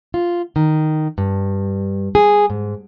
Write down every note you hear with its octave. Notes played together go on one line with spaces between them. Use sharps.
F4
D#3
G2
G#4
G#2